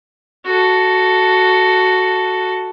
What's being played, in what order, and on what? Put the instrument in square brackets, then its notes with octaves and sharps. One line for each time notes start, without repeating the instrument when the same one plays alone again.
[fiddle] F#4 A4